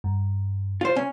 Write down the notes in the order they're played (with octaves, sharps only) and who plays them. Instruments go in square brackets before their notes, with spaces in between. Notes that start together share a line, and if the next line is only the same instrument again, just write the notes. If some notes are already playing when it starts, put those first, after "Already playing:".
[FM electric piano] G2
[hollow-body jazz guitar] F4 C5
[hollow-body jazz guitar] C#4 [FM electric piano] G#5